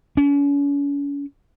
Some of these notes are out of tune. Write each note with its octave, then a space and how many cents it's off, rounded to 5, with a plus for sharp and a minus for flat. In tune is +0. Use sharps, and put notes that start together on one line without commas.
C#4 +40